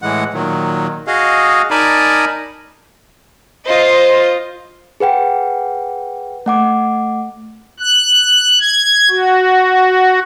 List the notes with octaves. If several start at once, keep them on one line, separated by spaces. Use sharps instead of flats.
A2 E3 G#3 F#5
A#2 D#3 F#3
F#4 G#4 D#5 F5
D#4 A#4 D5 G#5 A5 B5
F4 C5 D#5
G#4 B4 F#5 G5
A3 F#5 D6
F#6
G#6
F#4